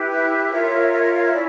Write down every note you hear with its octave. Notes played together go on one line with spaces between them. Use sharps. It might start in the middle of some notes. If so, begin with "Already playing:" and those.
Already playing: E4 G4 B4
E5
F4 A#4 C#5
E5
E5
F5
E5
C#4 E4 D5